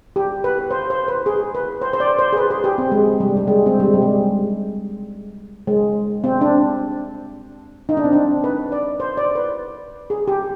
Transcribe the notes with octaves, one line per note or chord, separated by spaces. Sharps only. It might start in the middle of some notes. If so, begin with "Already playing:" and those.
G4
B4
C5
C5
B4
G#4
B4
C5
C5
D5
C5
G#4
B4
G#4
G4
C4
G#3
G3
G3
G#3
C4
G3
G#3
G3
G#3
G#3
C4
D4
D#4
D4
C4
D4
B4
D5
C5
D5
B4
G#4
G4